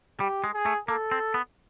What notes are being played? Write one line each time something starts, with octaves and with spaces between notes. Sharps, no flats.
G3 G4
G#3
G#4
A3
A#3 A4
C4
B3